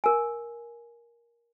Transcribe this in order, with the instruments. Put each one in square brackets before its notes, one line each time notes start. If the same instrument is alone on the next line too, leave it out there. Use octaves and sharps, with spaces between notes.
[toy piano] A#4 G#5